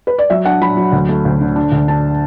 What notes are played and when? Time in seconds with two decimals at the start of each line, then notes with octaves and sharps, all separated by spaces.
0.07 B4
0.18 D5
0.30 F#3 E5
0.45 D4 F#5
0.62 F#3 B5
0.77 F#3
0.92 D2
1.09 A3
1.25 D2
1.41 D3
1.56 D4
1.72 D2
1.88 D4 A5